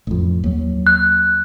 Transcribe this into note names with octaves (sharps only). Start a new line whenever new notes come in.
A1 F2
D#2 F#3
F#6